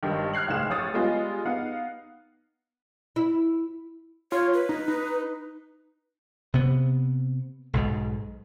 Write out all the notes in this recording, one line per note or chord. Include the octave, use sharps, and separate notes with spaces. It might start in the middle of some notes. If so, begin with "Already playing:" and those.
G#1 G2 D#3
F6 F#6 G#6 C7 F#7
F#1 C#2 A2 D#4 G#4 E7
A1 C#5 D#6 A6
G3 G#3 B3 F4 G#4 D#5
B3 D#4 F5 F#5
E4
F4 C#5
B4
D#4
D#4
C3 B3
B1 G#2 B2